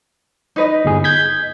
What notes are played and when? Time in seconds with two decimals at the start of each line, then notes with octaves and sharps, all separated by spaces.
0.56 D#4 B4 D#5
0.85 G1 G#4
1.04 G6 G#6 B6